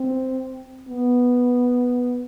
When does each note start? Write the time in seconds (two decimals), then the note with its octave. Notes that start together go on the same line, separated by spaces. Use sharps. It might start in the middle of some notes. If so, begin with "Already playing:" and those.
Already playing: C4
0.89 B3